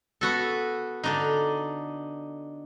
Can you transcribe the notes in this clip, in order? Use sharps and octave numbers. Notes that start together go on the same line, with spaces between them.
B3 F#4 A4
D3 D4 D#4